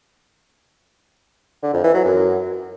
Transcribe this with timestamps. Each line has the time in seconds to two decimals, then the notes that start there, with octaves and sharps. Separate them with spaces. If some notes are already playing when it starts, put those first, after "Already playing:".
1.63 D3
1.73 F2
1.84 E3
1.94 F#3
2.05 F#2